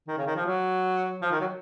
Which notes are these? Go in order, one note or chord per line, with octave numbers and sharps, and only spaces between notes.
D#3
C#3
D#3
F3
F#3
F3
D#3
F#3